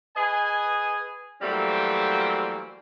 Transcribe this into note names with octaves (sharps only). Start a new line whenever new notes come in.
G#4 B4 D#5 G#5
E3 F#3 G3 A3 A#3 C4